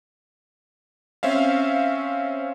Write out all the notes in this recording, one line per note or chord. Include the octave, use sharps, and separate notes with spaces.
C4 C#4 E5 F5